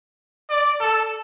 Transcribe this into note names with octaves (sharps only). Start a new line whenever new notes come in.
D5
A4